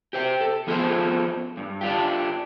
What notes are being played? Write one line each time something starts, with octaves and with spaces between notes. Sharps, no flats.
G4 C5 G5
A4
F3 B3 F4 G#4 A4 C5
G2
D4 F4 G4